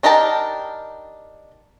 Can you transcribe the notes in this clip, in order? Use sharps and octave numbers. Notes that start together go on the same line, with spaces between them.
D4 D#4 G4 A#4 A5